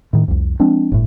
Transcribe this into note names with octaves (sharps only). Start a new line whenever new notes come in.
A2 D#3
C2 F2
F3 G#3 C4 D4
G1 A2